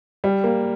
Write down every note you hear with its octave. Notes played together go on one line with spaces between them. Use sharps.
G3
A#3